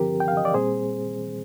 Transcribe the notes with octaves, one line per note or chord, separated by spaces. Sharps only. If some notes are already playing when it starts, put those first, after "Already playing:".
Already playing: G2 D3 F3 C4 G4 A#4
G5
F5
D#5
D5
A#2 G3 C4 G#4 C5